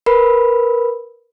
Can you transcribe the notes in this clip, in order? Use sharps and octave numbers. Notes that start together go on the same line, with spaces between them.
A#4 B4 B5